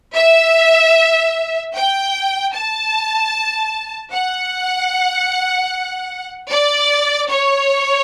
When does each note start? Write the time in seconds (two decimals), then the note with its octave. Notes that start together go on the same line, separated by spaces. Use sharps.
0.15 E5
1.74 G5
2.53 A5
4.12 F#5
6.50 D5
7.28 C#5